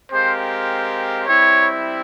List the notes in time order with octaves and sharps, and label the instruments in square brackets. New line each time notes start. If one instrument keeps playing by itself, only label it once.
[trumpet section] G#3 C4 G4 A#4 F5 [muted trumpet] C5
[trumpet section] G3 C4 E4 [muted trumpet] C#5